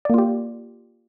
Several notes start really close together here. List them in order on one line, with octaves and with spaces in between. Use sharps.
D5 A#3 F4 G4